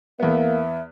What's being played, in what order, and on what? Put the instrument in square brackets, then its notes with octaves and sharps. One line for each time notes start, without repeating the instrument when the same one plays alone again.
[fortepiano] E2 B3 [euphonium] A#3 [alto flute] E5